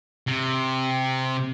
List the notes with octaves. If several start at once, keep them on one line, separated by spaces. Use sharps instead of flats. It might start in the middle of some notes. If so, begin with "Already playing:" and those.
C3